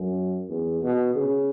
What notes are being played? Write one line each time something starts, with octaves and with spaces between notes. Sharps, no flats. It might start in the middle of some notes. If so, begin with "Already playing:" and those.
Already playing: F#2
E2
B2
C#3